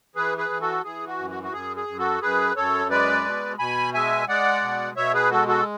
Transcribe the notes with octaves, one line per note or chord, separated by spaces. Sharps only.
E3 G#4 B4
G#4 B4
E3
F#4 A4
E3 G#4
F#4
F#2
F#4
F#4
F#2 G#4
G#4
F#2
F#4 A4
F#2 G#4 B4
F#2 A4 C#5
G#3 B4 D5
B2
B2 G#5 B5
G#3 E5 G#5
G#3 D5 F#5
B2
B2 C#5 E5
G#4 B4
G#3 F#4 A4
F#4 A4